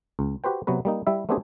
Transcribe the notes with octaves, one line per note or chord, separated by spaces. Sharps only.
C#2
F#4 G4 B4 C5 G5
C3 F#3 B3 F#4 B4
G3 A#3 D#4
G3 E4 E5
A3 B3 C4 D4 G4 G#4